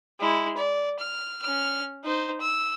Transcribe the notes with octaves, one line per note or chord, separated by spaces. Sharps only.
G#3 E4
D5
F6
C#4 F6
D#4 C5
E6